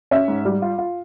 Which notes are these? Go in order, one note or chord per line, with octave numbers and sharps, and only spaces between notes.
C#4 E5
G#2
G3
F4
F4